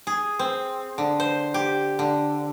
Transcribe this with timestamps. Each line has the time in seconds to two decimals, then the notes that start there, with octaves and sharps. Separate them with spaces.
0.07 G#4
0.39 C4
0.98 D3
1.20 C5
1.54 G4
1.99 D3